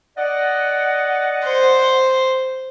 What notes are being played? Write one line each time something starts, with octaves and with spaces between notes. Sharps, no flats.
D5 D#5 F#5
C5